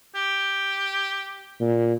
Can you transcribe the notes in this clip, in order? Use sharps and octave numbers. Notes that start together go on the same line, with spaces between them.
G4
A#2